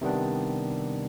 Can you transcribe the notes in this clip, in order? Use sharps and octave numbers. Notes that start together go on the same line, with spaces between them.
C3 D#3 G3 B3 D4